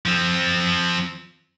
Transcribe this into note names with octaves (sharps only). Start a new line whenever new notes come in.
F3 C4